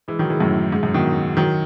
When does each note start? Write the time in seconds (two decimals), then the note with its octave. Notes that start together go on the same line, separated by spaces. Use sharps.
0.08 E3 G#3
0.19 D#3 F#3
0.30 E3 G#3
0.40 F#2 A2
0.72 G#2
0.83 F#2
0.94 B2 D#3
1.37 D#3 F#3